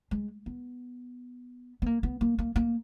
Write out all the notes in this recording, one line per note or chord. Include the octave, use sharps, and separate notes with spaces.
G#3
B3
B3
A#3
B3
A#3
A#3
A#3